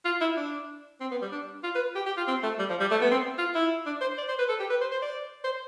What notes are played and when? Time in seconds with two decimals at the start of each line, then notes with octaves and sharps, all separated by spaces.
0.05 F4
0.21 E4
0.37 D4
1.01 C4
1.11 B3
1.22 G3
1.32 D4
1.63 F4
1.75 B4
1.96 G4
2.06 G4
2.17 F4
2.27 C4
2.43 A3
2.59 G3
2.69 F3
2.80 G3
2.91 A3
3.01 B3
3.11 C4
3.38 F4
3.55 E4
3.86 D4
4.01 C5
4.18 D5
4.29 C5
4.39 B4
4.49 A4
4.60 G4
4.70 B4
4.81 C5
4.92 C5
5.02 D5
5.44 C5